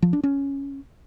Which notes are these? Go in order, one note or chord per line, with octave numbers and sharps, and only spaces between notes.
F3
D4
C#4